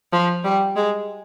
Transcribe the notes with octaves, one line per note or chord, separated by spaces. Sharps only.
F3
G3
G#3